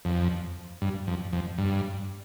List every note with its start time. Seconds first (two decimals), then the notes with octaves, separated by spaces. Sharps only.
0.05 F2
0.82 G2
1.07 F2
1.32 F2
1.58 G2